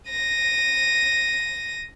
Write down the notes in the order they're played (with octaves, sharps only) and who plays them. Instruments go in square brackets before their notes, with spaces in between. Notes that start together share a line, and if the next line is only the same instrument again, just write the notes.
[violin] A#6 D#7